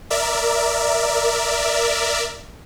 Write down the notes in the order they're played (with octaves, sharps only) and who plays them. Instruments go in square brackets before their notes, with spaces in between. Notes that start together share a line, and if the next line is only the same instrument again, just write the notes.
[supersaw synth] A#4 D5 E5